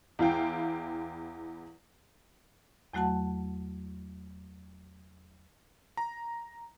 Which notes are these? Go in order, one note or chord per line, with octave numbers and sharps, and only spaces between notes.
E2 E4 F5 G5
E2 F#3 A3 F#4 F#5 A5
A#5